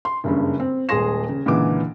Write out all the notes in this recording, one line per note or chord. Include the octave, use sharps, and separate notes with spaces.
C6
F#1 G2 C#3
C4
D#1 G#3 G#4 C6 A#6 E7
C#3
C#2 A#2 D3 E3 D6